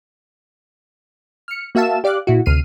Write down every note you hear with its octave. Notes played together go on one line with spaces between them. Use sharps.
F6 C#7
A#3 F#4 E5 F5 A5 E7
G4 D5 F5 D6 F#6
A#2 E4 F#4
D2 C3 F6 C7 D#7